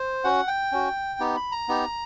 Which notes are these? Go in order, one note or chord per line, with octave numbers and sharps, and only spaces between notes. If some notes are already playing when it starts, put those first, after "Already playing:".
Already playing: C5
C#4 F#4 F#5
G5
C#4 F#4
B3 D#4 G4
B5
A#5
B3 D#4 G4